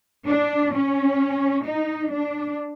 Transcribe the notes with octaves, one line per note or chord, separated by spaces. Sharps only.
D4
C#4
D#4
D4